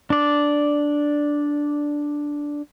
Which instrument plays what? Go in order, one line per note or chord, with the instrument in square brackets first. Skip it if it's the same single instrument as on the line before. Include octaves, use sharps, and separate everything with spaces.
[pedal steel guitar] D4 D5